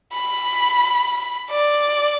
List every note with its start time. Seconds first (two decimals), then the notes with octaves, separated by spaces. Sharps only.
0.13 B5
1.50 D5